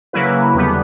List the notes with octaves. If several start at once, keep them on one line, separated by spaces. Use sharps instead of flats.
C#3 F#3 A#3 E4 B4
E2 D3 G3 B3